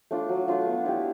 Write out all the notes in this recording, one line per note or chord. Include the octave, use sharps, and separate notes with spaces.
A3 D4 F4
F#3
A3 D4 F4
B3
E4 G4